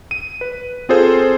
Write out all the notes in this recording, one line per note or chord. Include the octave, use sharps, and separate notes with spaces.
D#7
B4
C4 F4 G#4 A4 C5